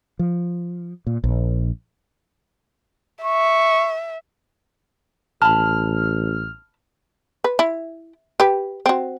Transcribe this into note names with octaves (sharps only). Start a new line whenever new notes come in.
F3
A#2
A#1
E5 C#6
A1 A5 B5 F6
B4
E4
G4 B4
C4 F#4